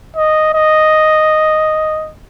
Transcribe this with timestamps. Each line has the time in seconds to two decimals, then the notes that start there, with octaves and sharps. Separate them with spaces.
0.16 D#5
0.54 D#5